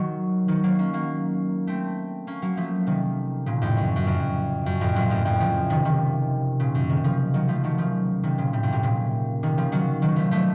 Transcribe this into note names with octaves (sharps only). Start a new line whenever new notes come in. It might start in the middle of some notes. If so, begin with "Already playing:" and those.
Already playing: D#3 F#3
D#3 F#3
F#3 A#3
A#3 C#4
F#3 A#3
A3 C4
A#3 C#4
F#3 A#3
F3 A3
C3 D#3
A#2 C#3
F2 A2
F#2
F#2
F2
F#2
F2 A2
F#2 A#2
F2 A2
F2 A2
C#3 F3
C3 D#3
C3 D#3
A#2 C#3
F#2
C3 D#3
C#3 F3
D#3 F#3
F3 A3
D#3 F#3
C#3 F3
C3 D#3
A#2 C#3
A2 C3
F#2 A#2
A2 C3
A#2 C#3
C3 D#3
C#3 F3
D#3 F#3
D#3 F#3
F3 A3
F3 A3